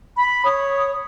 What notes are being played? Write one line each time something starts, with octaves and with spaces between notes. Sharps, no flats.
B5
C#5 D#6